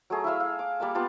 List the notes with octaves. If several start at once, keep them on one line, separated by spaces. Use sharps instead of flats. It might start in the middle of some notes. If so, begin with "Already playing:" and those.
F#3 A3 G#4 A#5
E4 E5 F5 E6
F5
D6
G3 A#3 A5 D6
B3 F4 G4 A5